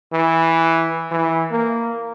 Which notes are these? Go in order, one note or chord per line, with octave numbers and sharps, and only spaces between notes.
E3
E3
A#3